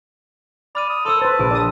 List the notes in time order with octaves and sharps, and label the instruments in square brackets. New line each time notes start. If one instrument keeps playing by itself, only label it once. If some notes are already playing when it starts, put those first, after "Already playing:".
[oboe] D5 [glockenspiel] B5 F6 D#7
[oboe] D#6
[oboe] A4 [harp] C#5 D#6 [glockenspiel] C6 E6
[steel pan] B4 C5 [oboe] A5
[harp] A#1 D7
[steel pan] D5 D#6 [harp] E7